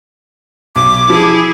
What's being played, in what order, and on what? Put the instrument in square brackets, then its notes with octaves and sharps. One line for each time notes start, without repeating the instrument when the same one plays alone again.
[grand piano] B1 [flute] D6
[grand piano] E3 F3 [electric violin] E4 G#4